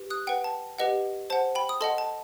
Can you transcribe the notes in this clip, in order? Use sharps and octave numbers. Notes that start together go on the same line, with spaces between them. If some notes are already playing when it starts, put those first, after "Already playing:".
Already playing: G4 B4
D#6 F#6
B4 F#5 G5
A5
G4 B4 D#5 F#5
C5 F#5 A5
G5 B5
D#6
A4 D#5 F#5 A5 C6
A5